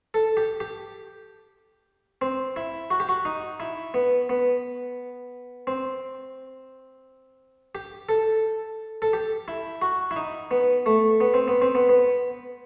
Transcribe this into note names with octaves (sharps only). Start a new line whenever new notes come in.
A4
G4
G4
C4
E4
F#4
G4
F#4
D#4
E4
B3
B3
C4
G4
A4
A4
G4
E4
F#4
E4
D#4
B3
A3
B3
C4
B3
C4
B3
B3